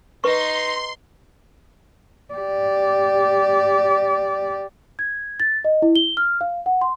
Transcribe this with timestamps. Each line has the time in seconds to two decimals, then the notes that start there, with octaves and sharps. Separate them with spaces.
0.24 D#4 B4 C6 C#6
2.34 G4 D5
4.99 G#6
5.40 A6
5.65 D#5
5.82 E4
5.96 G7
6.17 F6
6.41 F5
6.66 F#5
6.81 C6